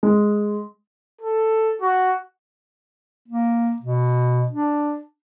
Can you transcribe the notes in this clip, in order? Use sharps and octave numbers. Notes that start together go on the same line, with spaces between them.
G#3
A4
F#4
A#3
B2
D4